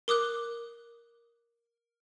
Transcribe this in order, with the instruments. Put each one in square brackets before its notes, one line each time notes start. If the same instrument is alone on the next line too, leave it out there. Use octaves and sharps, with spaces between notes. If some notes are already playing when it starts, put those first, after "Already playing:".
[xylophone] A#4 D6 D#6 F#6